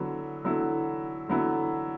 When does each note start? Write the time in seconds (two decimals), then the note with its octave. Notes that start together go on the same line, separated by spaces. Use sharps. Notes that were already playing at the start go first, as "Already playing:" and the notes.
Already playing: D3 F#3 B3 E4
0.44 D3 F#3 B3 E4 A4
1.28 D3 F#3 B3 E4 A4